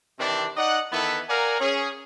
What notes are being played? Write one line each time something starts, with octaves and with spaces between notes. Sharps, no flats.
C3 D#3 E3 C4 D4
D#4 D5 D#5 F#5
D#3 E3 B3 E4 A4 B4
A#4 D5 F5 F#5 G#5 A#5
C#4 G#4